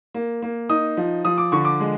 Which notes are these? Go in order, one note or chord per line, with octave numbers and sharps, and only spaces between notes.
A#3
A#3
D#4 D#6
F3
F3 D#6
D6
D3 C#6
D6
G#3